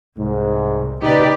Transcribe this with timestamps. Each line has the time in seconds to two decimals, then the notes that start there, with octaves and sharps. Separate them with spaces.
0.18 C2 G#2
1.02 A#2 C#3 D#4 G4 B4 D5